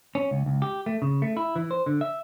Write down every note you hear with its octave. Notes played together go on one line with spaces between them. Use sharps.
C#4
C#2
C#2
G4
A3
C#3
A3
E4
E3
C5
D3
E5